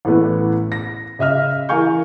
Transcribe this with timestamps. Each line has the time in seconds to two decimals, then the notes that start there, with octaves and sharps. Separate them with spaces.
0.05 A1 E3 A3 B3 B4
0.72 A#6
1.19 C#3 D#5 E5 F6
1.69 E3 A#4 F5 G#5 C#6 G6